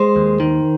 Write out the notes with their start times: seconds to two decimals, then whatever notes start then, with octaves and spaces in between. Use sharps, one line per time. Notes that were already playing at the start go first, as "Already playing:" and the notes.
Already playing: G#3 C5
0.16 D#2
0.40 D#3